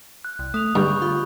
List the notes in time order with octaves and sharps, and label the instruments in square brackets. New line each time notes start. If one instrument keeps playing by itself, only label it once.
[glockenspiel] F#6
[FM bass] C2
[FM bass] A3 [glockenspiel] D#6 F7
[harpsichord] G2 [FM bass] D3 [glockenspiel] B5 C#6 G6
[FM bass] F4